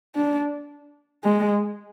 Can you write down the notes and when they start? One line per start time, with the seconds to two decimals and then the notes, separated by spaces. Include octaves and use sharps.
0.15 D4
1.24 G#3